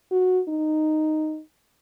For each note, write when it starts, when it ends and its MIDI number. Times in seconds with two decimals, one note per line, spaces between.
0.11 0.40 66
0.49 1.40 63